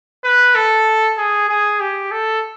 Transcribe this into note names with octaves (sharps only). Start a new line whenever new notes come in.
B4
A4
G#4
G#4
G4
A4